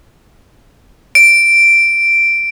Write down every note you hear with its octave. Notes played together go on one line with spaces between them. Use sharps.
D7